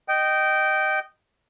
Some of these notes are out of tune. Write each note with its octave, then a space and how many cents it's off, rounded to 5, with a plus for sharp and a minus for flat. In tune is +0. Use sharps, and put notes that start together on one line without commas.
D#5 -10 G5 -20